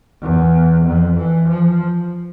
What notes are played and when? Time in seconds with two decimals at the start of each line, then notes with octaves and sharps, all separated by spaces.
0.22 E2
0.85 F2
1.17 E3
1.49 F3